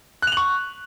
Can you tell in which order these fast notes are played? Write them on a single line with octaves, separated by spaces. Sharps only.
F#6 F7 F#7 C#6